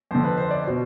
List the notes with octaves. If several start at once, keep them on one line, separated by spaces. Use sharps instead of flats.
F2 D3 C5
B4
C5
D5
B2 C5